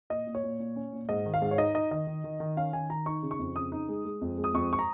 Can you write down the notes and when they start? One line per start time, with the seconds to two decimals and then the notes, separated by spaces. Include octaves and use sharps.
0.10 A#2 D#5
0.27 A#2
0.35 C#5
0.43 A#2
0.59 A#2
0.76 C#4
0.93 A#2
1.09 G#2 D#5
1.26 D#3
1.34 F5
1.42 G#2
1.51 C#5
1.58 D#4 D#5
1.75 D#4 D#5
1.91 D#3 D#5
2.07 D#3
2.24 D#3
2.40 D#3
2.57 C#4 F5
2.73 D#3 G#5
2.90 D#3 A#5
3.06 D#4 C#6
3.23 C#3
3.31 C#6
3.39 F2
3.56 C#3 D#6
3.72 D#4
3.89 G#3
4.05 G#3
4.21 F2
4.38 G#3
4.44 D#6
4.54 F2 C#6
4.73 C#6
4.79 A#5